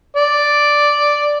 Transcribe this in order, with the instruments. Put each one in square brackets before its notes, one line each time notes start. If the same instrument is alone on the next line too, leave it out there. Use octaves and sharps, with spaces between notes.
[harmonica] D5